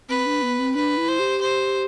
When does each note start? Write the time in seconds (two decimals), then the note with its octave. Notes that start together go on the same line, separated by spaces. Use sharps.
0.09 C4 B4
0.26 D4
0.42 B3
0.59 C4
0.75 D4 B4
0.97 E4
1.08 C5
1.19 G4
1.41 C5